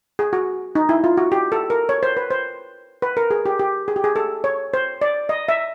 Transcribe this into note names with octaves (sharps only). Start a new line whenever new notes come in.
G#4
F#4
D#4
E4
F4
F#4
G4
A4
A#4
C#5
C5
B4
C5
B4
A#4
G#4
G4
G4
G#4
G4
G#4
A4
C#5
C5
D5
D#5
E5